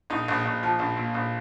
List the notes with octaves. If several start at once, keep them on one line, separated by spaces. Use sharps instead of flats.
A#1 D#4
A#1
A#1
F3
A#1
A#2
A#1